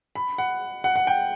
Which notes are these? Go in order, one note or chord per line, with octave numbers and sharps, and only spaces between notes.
B5
F#5
F#5
F#5
G5